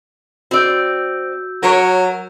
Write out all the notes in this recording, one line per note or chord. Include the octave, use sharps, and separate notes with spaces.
C4 F#4 D5 E6 G6
F#3 A#4 C#5